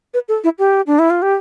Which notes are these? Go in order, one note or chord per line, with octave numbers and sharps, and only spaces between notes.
B4
A4
E4
G4
D4
E4
F4
G4